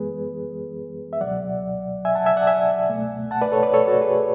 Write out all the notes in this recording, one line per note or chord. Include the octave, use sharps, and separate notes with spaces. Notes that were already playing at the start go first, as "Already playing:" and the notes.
Already playing: F#2 E3 G#3 B3 G#4 B4
E5
C#2 B2 F#3 D5 F#5
E5 G#5
F#5 A5
E5 G#5
D5 F#5
E5 G#5
C#2 B2 A3
F#5 A5
B4 D5
A4 C#5
B4 D5
A4 C#5
F#4 A4
G#4 B4